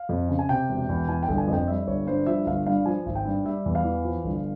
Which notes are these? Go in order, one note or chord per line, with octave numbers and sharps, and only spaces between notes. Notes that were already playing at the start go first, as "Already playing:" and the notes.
Already playing: F5
F2
C#3
G#5
C3 G5
E1
E2
E3 G#5
G5
G1
G#5
F2 G5
G3 E5
G1 C#5
G2 C5
F3 E5
G1 F5
G2 F5
F3 G#5
G#1
G5
G2
G3 E5
E2
F5
E3
F3
G1